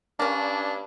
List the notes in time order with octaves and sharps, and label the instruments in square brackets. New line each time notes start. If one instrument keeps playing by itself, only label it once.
[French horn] G2 [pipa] A#3 C#4 [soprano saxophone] D4